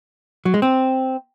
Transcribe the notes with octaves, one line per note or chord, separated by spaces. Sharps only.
F#3
G#3
C4